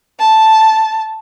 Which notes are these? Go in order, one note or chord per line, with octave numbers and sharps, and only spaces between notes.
A5